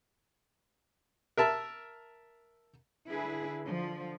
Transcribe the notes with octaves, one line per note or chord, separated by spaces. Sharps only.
A#4 E5 A5
D3 E4 G#4 B4
D3 F3